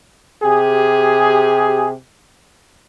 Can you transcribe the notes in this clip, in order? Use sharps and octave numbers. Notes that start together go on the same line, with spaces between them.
C3 G4 G#4